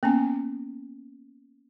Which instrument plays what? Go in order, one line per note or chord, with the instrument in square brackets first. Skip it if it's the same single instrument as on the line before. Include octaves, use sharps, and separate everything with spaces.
[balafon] A#3 B3 C#4 G#5